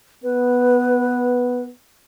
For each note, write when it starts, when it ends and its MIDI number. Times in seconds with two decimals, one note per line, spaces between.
0.24 1.71 59
0.24 1.65 71